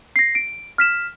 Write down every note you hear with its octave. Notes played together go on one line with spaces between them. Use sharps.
A#6 C7
D7
F6 B6 E7